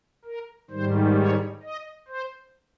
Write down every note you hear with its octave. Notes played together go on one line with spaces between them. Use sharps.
A#4
G#2 D#3 G3 C5
C#5
D#5
C5